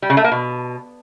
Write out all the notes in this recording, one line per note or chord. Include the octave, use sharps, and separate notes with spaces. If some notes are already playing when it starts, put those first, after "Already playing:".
G3
C#3
A3
A#3
B2